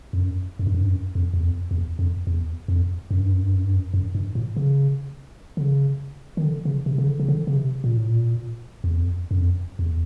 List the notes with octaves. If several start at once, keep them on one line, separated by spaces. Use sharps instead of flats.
F2
F#2
F#2
G2
F#2
G2
F#2
F2
E2
F2
E2
F2
E2
F2
F#2
G2
F#2
G2
F#2
G2
F#2
F#2
G2
A2
C#3
D3
C#3
D#3
D3
C#3
C3
C#3
D3
C#3
D3
C#3
C3
A#2
A2
A#2
E2
F2
F#2
F2
E2